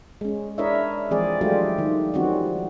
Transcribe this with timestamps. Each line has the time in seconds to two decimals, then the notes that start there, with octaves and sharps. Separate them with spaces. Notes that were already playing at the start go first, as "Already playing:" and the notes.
0.21 G#3 C#4
0.58 D4 E4 A#4 C#5 D#5 E5
1.11 E3 F3 G#3 C4 G#4 D5
1.41 F#3 G#3 A3 D4 F4 G4
1.78 D#3
2.14 D#3 F3 G3 C4 C#4 F#4